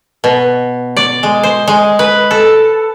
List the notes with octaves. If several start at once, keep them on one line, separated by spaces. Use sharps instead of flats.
B2
D5
G#3
C5
G#3
B4
A4